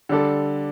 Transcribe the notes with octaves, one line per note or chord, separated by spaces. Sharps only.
D3 G3 D4 A4